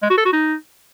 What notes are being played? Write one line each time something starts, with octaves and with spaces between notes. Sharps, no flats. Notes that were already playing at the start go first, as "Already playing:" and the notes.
G#3
F#4
A4
F#4
D#4